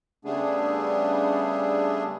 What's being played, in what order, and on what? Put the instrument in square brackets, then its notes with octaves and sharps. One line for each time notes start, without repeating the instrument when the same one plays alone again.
[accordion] C#3 G3 A3 B3 D4 G#4